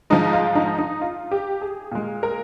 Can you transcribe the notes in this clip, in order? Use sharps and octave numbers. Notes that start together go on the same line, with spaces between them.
G#2 F3 G#3 D#4
F4
D#4
D#4
F4
G4
G#4
A#2 G#3
A#4